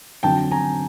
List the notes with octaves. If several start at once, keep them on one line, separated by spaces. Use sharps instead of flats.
F2 D3 F#3 G5 A5
G#5 A#5